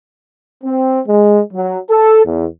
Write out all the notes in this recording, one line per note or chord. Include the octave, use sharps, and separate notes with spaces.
C4
G#3
F#3
A4
E2